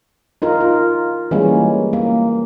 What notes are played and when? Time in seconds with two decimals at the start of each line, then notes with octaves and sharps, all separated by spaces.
0.42 D#4 F4 A#4
0.61 F4
1.31 E3 G3 G#3 A#3 C#4
1.93 A#3